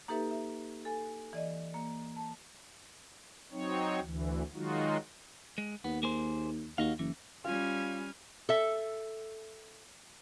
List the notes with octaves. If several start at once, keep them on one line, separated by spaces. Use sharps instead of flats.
A#3 D#4 G4 A4 B4 E5
E5
A4 G#5
E3 D5 D#5
A#3
A5
F#3 C4 D#4 C#5
D2 E3
D#3 F#3 G#3 D#4 F4 F#4
G#3
D#2 B3
A#3 G#4 C5
D#2 F#4 D#5 F5
F#1 E3
G3 C#4 F4 G#5 F6
A4 E5